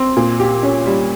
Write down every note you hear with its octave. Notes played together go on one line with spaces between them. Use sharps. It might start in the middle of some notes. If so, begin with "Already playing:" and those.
Already playing: C4
A#2
G4
C#4
G3